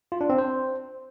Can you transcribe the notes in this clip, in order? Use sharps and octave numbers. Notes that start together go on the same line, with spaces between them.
F4
D4
C4
C5